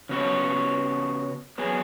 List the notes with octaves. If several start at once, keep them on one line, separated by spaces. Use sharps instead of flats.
C#3 B3 F#4 C#5
F#3 B3 G#4